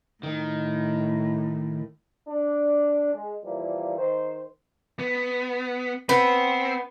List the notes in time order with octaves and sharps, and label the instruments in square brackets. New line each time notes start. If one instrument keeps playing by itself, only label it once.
[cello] A2 [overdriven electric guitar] D#3
[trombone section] D4
G#3
A#2 E3 F3 G3 A#3
D#3 C5
[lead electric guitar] B3
[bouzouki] B3 [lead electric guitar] C4